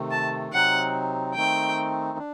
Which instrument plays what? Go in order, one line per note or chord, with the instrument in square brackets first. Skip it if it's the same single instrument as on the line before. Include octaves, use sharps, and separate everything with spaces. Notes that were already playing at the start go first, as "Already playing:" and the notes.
Already playing: [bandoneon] C3 D#3 A3
[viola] A5
[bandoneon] C3 F#3 C4 D#4 [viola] F#5
[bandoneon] D#3 A3 C4 D#4 [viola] G5
[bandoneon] D4